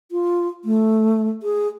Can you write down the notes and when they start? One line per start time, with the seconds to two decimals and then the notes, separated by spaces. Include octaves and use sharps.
0.12 F4
0.65 A3
1.43 G#4